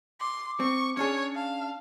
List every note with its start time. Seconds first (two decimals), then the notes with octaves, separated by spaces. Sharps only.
0.20 C6 D6
0.60 C4 C#6
0.97 C#4 D4 G#4 C#5
1.35 F5 A5